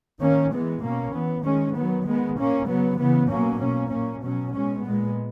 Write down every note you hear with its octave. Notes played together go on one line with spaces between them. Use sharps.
D#3 A#3 C#4
E3 G#3 B3
B2 A#3 C#4
E3 B3
D#3 G#3 C#4
D#3 F#3 B3
D#3 G#3 B3
A#2 A#3 C#4
C#3 F#3 B3
C#3 E3 B3
B2 F#3 A#3 C#4
B2 A#3 C#4
A#2 A#3 C#4
B2 F#3 C#4
B2 G#3 C#4
A#2 G#3 B3